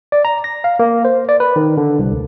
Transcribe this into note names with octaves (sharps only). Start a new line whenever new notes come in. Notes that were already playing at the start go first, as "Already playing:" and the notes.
D5
A#5
A#6
F5
A#3
C5
D5
B4
D#3
D3
C2
D2